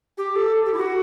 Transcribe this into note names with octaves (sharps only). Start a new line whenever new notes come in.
G4
A4
G4
E4
F#4